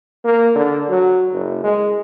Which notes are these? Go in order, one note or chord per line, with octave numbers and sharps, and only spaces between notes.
A#3
D3
F#3
F#1
G#3